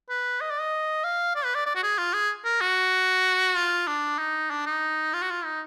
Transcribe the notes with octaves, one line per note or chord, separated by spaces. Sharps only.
B4
D#5
D5
D#5
F5
D5
B4
D5
D5
F#4
G#4
F4
G#4
A#4
F#4
F4
D4
D#4
D4
D#4
F4
F#4
F4
D#4